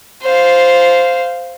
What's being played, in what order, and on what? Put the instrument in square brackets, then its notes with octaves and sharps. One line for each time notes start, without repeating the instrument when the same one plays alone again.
[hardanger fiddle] C5 F5